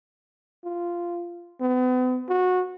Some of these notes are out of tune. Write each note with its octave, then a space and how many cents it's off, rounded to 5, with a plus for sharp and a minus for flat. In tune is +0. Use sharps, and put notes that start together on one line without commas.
F4 -10
B3 +40
F#4 -20